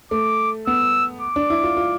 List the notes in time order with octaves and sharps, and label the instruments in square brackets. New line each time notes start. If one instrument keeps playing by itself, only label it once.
[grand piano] A3 [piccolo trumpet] D6
[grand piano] B3 [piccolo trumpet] E6
[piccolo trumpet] D6
[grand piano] D4
E4
F4
F4